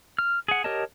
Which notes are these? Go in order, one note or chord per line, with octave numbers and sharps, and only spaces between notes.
F6
G#4 F#5
G4 A#4 C#5 D#5 A5